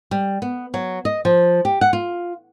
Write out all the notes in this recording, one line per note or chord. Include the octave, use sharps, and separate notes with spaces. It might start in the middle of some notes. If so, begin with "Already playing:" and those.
G3
B3
F#3
D#5
F3
G4
F#5
F4